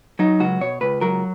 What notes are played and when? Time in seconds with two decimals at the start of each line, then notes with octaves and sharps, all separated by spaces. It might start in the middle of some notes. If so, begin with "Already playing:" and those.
0.19 F#3 D#4
0.40 C#2 F#4
0.61 B2 C#5
0.81 C#2 B4
1.01 F#3 A#4